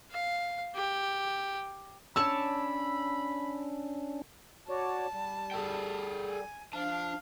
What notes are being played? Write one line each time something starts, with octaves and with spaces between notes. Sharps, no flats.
F5
G4
C#4 D4 C#5 D5 A5 B5 E6
F#4 C#5 D5 A5
G3
G#4 A4 G5
G#5
F3 D4 F5 A5